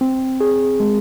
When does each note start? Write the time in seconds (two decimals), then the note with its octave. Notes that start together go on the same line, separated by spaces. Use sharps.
0.01 C4
0.41 G#4
0.80 G#3